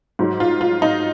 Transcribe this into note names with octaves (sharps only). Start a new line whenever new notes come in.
G#2 F#3
F4
F4
D#4